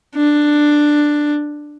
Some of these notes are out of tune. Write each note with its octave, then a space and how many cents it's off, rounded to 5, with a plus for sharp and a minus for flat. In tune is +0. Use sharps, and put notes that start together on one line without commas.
D4 +10